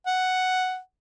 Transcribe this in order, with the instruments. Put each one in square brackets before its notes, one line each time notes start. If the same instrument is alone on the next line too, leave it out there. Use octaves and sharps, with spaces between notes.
[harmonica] F#5